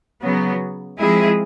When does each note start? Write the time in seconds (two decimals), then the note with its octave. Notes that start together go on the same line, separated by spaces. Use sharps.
0.22 C#3 F#3 B3
0.99 F3 G#3 C4 E4 G#4